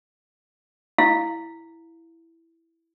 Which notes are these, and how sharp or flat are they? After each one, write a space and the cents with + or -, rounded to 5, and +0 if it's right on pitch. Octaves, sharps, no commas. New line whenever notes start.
E4 +0 F5 +0